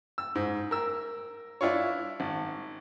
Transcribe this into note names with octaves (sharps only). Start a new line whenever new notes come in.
E6
G#2
A#4 E6
D4 E4 F4 C#5
G#1